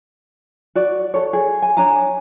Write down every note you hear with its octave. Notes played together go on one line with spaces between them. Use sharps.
F#4 D5
A4 C#5
G#4
G#5
D4 C#5 G#5 A#5